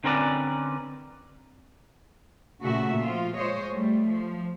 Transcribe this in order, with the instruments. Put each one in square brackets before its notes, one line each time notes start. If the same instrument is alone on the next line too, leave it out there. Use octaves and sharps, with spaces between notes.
[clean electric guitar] D3 C4 C#4 A#4 B4 D5
[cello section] A#2 C#3 A3 F#4 E5
F3 F4
G#3 C5 C#5 D#5
G3 A3
F3